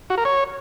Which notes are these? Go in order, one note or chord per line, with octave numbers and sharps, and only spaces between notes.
F#4
A#4
C#5